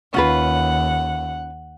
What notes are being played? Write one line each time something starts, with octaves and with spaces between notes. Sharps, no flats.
D#2 C#4 F4 B4 F#5